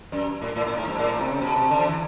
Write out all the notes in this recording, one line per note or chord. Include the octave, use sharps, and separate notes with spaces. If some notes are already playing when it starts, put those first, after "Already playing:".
F#2
A2
A2
A2
G#2
G2
A2
A#2
C3
C#3
B2
C3
D3
F3
E3